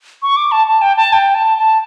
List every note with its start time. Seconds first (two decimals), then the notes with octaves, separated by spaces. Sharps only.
0.22 C#6
0.36 D6
0.51 A5
0.67 A5
0.81 G5
0.97 A5
1.13 G5
1.34 A5
1.58 A5